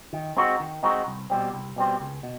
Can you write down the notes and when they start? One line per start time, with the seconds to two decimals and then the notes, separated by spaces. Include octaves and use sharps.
0.13 D#3
0.36 G#3 C4 D#4 F#4
0.60 D#3
0.83 G#3 C4 D#4 F#4
1.07 C2
1.30 B2 G3 C4
1.53 C2
1.76 B2 G3 C4
2.00 C#2
2.23 B2